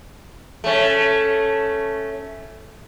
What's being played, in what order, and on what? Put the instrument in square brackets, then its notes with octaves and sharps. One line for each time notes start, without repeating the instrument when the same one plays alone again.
[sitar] A3 C#4